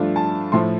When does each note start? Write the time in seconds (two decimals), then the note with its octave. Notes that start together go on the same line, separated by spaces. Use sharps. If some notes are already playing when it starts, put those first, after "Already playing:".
Already playing: G2 F3 A3 D4 F4
0.16 A5
0.52 A2 F3 A3 C6